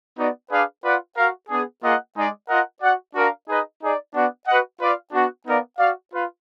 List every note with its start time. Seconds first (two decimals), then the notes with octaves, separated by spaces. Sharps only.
0.18 B3 D#4 F#4 D5
0.51 D4 G#4 B4 D5 F5
0.84 F4 B4 D5 F#5
1.16 F#4 A#4 F5
1.49 B3 D4 G#4
1.83 A#3 F4 G#4 D#5 F#5
2.15 G#3 D#4 G#4 D5
2.49 F4 A#4 D#5 F#5
2.81 F#4 D5 F#5
3.15 D4 F#4 A#4 F5
3.48 D#4 G#4 B4 D#5
3.81 D#4 G#4 D5
4.14 B3 D4 F#4 D5 F#5
4.47 F#4 B4 D#5 F#5
4.80 F4 B4 D5 F5
5.13 B3 D4 F#4
5.46 B3 D#4 A#4 D5 F5
5.78 F#4 D5 F5
6.12 F4 B4 F5